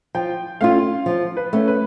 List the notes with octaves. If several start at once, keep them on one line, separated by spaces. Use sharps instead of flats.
F3 G5
A3 C#4 F4 F5
F3
B4
A3 C#4
B4